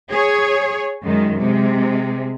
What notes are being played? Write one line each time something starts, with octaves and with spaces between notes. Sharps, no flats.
G#4 C#5
F#2 D#3 G#3
C3 G#3